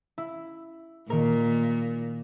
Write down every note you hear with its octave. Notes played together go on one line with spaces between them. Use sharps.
E4
A#2 D#3 A#4